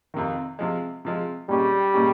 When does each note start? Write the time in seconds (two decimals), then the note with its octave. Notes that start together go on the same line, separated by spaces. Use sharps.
0.14 F2 C3 D#3
0.59 C3 F3 G#3
1.05 C3 F3 G#3
1.49 A#2 G3 G#3 C#4 G4
1.94 A#2 G#3 C#4 G4